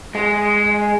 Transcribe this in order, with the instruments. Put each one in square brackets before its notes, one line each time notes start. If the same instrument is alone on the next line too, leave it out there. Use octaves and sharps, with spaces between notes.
[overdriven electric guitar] G#3